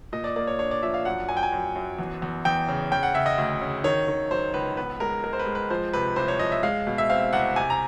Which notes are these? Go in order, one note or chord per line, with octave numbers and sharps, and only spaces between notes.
A#2 D#5
D5
A#3 D5
C#5
D4 C#5
D5
F3 E5
F5
F#2 F#5
F#2 G#5
G5
G#5
F#2
F#2
E2
E2
E2 G5
C#3
C#3 G5
F#5
C#3 E5
D#5
D2
C#3
D#3 C#5
D#3
F#3 C5
C#2 B4
B3 B4
G#3 A#4
G#3 A#4
C5
B4
G#3
B4
F3 C5
C3 B4
C2 C5
C#5
F3 D#5
E5
G#3 F5
B2
E5
C4 F5
C2 F#5
C3 G#5
A#5